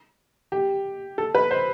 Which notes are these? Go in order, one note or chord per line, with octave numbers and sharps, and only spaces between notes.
G4
A4
B4
C5